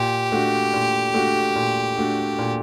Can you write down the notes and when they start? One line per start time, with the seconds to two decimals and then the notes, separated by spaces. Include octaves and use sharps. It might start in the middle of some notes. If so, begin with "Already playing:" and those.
Already playing: A#2 G4
0.32 A3 D4 F#4
0.73 A#2
1.14 A3 D4 F#4
1.56 A#2
1.97 A3 D4 F#4
2.38 A#2